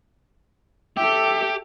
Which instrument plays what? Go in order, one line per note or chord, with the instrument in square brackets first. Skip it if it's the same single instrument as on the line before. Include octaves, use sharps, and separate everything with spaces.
[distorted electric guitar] G4 [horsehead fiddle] A4 E5